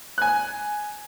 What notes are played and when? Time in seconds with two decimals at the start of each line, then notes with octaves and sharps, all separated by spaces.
0.18 G#5 F#6